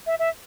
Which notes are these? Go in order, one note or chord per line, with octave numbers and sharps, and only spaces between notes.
E5
E5